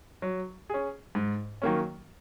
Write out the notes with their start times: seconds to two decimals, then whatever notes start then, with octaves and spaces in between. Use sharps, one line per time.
0.22 F#3
0.70 C#4 G#4
1.15 G#2
1.62 D#3 F#3 A#3 C#4